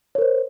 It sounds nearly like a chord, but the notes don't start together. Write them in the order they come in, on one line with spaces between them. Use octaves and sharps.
C#5 A#4 C5